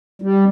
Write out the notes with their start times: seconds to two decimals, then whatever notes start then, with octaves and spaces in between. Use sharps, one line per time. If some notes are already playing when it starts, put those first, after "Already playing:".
0.22 G3